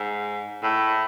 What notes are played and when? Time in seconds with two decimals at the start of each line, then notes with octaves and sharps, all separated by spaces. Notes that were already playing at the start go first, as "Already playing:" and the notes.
Already playing: G#2
0.62 A2